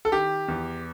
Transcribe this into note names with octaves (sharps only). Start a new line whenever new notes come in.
A4
D#3 G4
E2